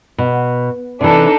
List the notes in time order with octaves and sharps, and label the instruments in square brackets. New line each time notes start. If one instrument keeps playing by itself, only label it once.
[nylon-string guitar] B2
[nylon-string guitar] C3 E3 [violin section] D4 D#4 A4